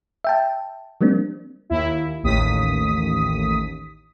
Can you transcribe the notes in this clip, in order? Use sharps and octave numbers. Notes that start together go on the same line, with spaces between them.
E5 G5 A5
F3 G3 A#3 C4 D4
D#2 E4
A1 D#2 D#6 B6